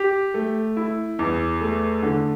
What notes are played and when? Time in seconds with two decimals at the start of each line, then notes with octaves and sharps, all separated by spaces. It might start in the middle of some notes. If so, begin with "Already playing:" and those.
Already playing: G4
0.34 A3
0.77 E4
1.19 E2
1.61 A3
2.03 D3